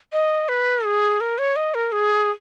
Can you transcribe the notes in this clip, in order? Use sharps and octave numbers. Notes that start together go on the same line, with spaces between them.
D#5
B4
G#4
A#4
C#5
D#5
A#4
G#4